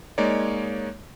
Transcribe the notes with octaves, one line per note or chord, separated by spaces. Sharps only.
G#3 A#3 D#4 C#5 D5